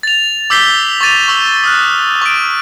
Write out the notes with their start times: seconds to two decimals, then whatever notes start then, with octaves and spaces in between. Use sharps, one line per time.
0.03 A6 F7
0.50 D6 E6 G6 B6 C7 G7
1.01 C#6 D6 A6 D#7 F7
1.28 C#6 E6 G7
1.64 D#6 F6 F#6
2.21 C#6 D7